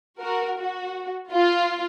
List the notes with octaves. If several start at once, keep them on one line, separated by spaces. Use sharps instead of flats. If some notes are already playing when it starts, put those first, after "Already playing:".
F#4 A#4
F#4
F4